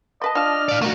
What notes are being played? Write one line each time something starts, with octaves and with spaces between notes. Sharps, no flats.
C4 B4 D#5 A5
D4 F4 A5 F6
D5 F5
A3 A#3 D#4 F#4